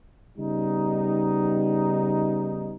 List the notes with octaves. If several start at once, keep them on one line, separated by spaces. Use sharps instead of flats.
C#3 G3 B3 D#4